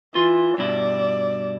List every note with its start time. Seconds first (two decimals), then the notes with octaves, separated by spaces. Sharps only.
0.15 E3 F4 C6
0.58 G2 B2 E4 D5